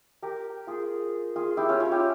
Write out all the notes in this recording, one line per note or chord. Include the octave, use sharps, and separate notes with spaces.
G4 A#4
F4 G#4
F4 G#4
E4 G4
C#4 F4
C#4 F4
E4 G4